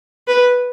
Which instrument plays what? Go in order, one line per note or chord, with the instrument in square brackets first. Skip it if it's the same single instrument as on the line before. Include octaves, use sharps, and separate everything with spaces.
[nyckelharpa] B4